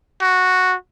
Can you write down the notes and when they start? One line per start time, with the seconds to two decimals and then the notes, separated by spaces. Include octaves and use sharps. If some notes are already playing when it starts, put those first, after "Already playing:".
0.21 F#4